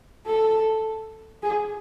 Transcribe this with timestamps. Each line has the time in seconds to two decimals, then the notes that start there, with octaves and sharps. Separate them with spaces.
0.27 A4
1.42 G#4